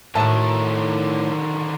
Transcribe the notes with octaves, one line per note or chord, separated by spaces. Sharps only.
A2 D3 D#3 F#4 E5 A5